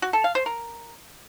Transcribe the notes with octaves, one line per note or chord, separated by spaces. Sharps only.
F#4
A4
F5
C5
A#4